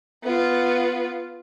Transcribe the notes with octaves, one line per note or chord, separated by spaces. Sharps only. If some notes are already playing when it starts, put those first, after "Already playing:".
B3 F4